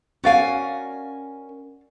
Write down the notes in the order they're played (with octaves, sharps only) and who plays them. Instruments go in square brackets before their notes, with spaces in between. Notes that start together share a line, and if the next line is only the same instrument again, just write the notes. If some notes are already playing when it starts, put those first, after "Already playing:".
[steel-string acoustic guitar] C#4 A#4 G#5 [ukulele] F#4 D5 F5